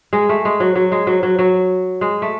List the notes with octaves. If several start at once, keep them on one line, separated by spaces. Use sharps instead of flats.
G#3
A3
G#3
F#3
F#3
G#3
F#3
F#3
F#3
G#3
A3